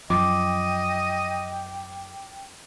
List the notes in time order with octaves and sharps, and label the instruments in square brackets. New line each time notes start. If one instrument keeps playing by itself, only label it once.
[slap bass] F#2 F3 [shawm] D#5 [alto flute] G5 [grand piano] D6